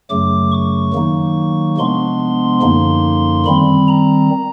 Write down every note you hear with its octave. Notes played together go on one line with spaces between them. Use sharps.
F#2 C#3 F#3 A3 D6
C#6
D#3 F#3 A#3 D#4
C3 F3 G#3 B3 D4 C6
F#2 D3 F3 A#3 D#4
D#3 G3 C4 B5
A#5